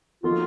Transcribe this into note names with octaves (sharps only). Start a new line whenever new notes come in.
F3 A#3 D#4 F4 F#4 A4